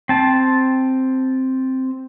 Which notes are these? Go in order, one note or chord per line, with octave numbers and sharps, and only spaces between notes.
C4 A5